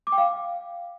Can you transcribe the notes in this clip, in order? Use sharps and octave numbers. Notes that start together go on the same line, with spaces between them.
D6
G5
F5